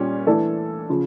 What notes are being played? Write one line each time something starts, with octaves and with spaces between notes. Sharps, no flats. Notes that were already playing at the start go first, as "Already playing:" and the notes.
Already playing: A#2 G3 C#4
E3 A3 D4 A4
C#3 F3